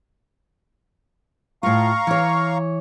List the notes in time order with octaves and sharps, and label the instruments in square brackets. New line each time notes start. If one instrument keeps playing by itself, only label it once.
[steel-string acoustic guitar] A2 F4 [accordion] F5 A#5 C#6
[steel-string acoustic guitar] E3 C#5